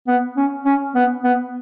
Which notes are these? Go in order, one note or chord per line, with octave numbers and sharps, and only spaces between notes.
B3
C#4
C#4
B3
B3